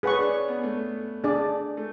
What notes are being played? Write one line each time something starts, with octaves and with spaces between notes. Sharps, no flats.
C#4 G#4 B4 F#5 C#6
D4
C#4
B3
A3
D4 G#4 D5
A3